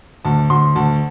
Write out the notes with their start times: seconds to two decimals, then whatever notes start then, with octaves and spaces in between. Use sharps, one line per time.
0.25 D2 A5
0.50 D2 C6
0.76 D2 A5